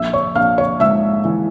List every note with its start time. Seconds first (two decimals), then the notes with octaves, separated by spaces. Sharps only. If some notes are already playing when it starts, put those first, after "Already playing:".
Already playing: A#1 E5 E6
0.13 C#5 C#6
0.35 A#1 F5 F6
0.58 C#5 C#6
0.80 G#2 E5 E6
1.25 E3